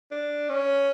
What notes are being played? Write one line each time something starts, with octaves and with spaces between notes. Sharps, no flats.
D4
C#4